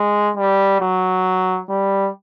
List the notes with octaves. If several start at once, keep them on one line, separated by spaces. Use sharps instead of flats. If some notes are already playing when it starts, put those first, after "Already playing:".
Already playing: G#3
G3
F#3
G3